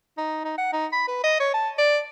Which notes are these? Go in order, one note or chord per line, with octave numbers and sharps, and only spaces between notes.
D#4
D#4
F#5
D#4
B5
B4
D#5
C#5
A5
D5